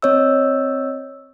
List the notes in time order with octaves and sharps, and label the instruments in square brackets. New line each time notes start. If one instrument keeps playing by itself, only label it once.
[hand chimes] C4 C#5 D#5 E6